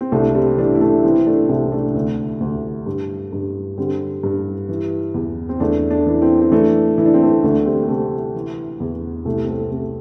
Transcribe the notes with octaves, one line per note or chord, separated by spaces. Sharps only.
C4
C2 A3 D4
G3 C4
E3 A3 D4
E4
A3 D4
E3 C4 E4
A3 D4
C2 C4 E4
A3 D4
D2
D2
G2
G2
D3 G3 C4
G2
E3
E2
C4
E2 A3 D4
A3 D4
E3
C4 E4
C4
E3 A3 D4
E3 E4
D4
C4
A3 D4
D2 A3 D4
G3 C4
C4
C3 A3
E3
E2
C2 A3
C4
A3
C3 A3